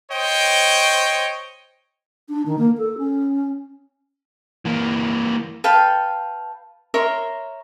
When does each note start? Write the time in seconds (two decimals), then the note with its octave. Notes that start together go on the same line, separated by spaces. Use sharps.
0.10 C5 C#5 D#5 G5
2.28 D4
2.46 D#3
2.58 A#3
2.78 A4
2.98 C#4
4.65 E3 A#3
5.64 A4 B4 F5 G5
6.94 A#4 C#5 E5 C6